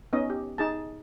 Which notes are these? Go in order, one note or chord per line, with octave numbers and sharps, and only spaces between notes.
B3 C#4 D#4 D#5
G4
D#4 G#4 A5